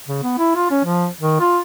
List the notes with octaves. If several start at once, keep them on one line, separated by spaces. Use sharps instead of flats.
C#3
B3
E4
F4
C#4
F3
D#3
F4